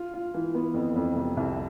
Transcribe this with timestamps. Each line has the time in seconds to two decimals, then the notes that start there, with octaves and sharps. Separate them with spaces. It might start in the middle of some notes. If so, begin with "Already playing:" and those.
Already playing: F4
0.13 F4
0.34 E3
0.55 B3
0.74 F2
0.96 F2
1.16 C3
1.37 C2